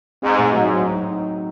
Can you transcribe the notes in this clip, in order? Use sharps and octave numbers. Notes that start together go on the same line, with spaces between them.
G#2 C4
A2
G#2 F#3
F#3
D#4